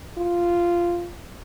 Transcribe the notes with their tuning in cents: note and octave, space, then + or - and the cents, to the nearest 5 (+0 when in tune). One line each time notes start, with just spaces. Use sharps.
F4 -10